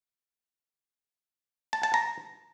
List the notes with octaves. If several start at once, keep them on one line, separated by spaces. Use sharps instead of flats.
A5
A5
A#5